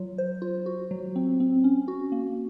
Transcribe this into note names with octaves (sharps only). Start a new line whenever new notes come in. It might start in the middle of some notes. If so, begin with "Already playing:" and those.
Already playing: F#3 F4
C5
F4
F#4
F#3
C4
C4
C#4
F#4
A#3